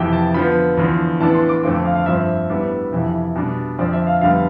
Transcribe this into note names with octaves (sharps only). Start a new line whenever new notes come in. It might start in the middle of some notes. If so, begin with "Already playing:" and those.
Already playing: F2 C3 E3 G5
A5
D3 F3 B3 B5
E2 D3 F3
A2 E3 B3 D4 A5
C6
D6
F2 D3 A3 C4 D6
D6
F5
F5
G2 F3 C4 E5
A2 G3 B3 D4
F2 C3 E3
B2 G3 D4
F2 D3 F3 C4 D5
E5
F5
F2 D3 G3 B3 F5